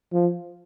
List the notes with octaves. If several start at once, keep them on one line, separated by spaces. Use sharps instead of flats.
F3